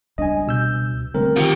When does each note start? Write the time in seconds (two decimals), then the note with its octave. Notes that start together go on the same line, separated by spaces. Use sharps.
0.18 C#2 G3 D4 D#5 G#5
0.47 B2 E6 G6
1.14 D3 G3 A3 C4 A#4
1.36 D#3 F4 G4